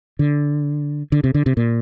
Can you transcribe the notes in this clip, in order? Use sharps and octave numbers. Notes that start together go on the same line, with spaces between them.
D3
D3
C3
D3
C3
A#2